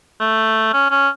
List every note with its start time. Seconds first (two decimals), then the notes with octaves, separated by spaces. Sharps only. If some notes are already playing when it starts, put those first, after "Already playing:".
0.20 A3
0.73 C#4
0.90 C#4